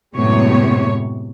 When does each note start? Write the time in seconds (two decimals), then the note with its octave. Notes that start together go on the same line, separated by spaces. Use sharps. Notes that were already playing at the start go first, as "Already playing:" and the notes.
0.16 F#2 A2 C3 G#3 B3 C#5